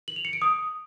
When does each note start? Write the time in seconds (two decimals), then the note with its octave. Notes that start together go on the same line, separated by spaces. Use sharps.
0.08 F#7
0.16 F7
0.25 C#7
0.33 D7
0.42 D#6